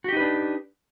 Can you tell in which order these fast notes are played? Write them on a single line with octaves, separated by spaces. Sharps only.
F#4 G4 D#4 B4 D4